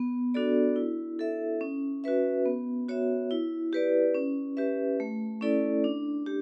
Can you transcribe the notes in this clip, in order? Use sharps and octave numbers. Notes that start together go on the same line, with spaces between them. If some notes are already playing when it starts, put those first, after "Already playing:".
Already playing: B3
D4 F#4 A4 D5
E4
A4 E5
C#4
F#4 B4 E5
B3
F#4 C#5 E5
E4
G4 B4 D5
C#4
G4 B4 E5
A3
C#4 E4 A4 D5
D4
G4